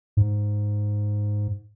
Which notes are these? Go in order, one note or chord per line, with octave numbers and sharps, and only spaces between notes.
G#2